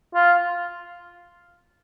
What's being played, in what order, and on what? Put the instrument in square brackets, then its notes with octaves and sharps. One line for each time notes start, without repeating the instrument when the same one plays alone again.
[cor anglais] F4